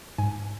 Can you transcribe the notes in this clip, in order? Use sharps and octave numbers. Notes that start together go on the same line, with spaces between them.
G#2 G#5